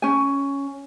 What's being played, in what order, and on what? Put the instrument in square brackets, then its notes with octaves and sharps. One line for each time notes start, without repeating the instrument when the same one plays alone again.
[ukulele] C#4 G#5